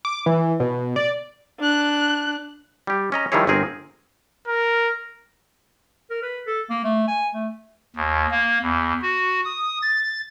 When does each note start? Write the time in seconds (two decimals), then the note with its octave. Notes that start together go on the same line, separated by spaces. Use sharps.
0.05 D6
0.26 E3
0.60 B2
0.96 D5
1.59 D4 F#6
2.87 G3 G4
3.12 C#4 D#5 A#5
3.32 D#3 F3 G3 E4 G#4 C#5
3.47 G1 C4 G#4 A#4
4.47 A#4
6.10 A#4
6.23 B4
6.46 A4
6.70 A#3
6.84 A3
7.08 G#5
7.34 A3
7.96 D#2
8.31 A#3
8.62 E2
9.02 F#4
9.45 D#6
9.82 A6